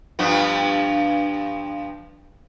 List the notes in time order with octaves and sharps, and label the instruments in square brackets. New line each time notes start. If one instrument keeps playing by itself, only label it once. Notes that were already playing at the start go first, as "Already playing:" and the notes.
[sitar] G2 F3 B3